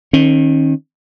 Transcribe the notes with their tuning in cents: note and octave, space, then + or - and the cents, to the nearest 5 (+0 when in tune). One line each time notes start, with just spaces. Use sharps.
D#3 -5 C#4 -40